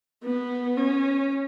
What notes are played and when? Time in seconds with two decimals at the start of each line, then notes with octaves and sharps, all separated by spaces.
0.24 B3
0.77 C#4